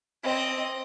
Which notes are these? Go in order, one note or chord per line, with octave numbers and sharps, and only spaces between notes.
C4 D#5